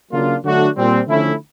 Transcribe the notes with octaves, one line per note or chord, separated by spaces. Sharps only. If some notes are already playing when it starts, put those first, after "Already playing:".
C#3 F#3 A#3 D4 F4
D3 F#3 A3 D4 F#4
A#2 G3 C4
D3 F3 A3 C#4 E4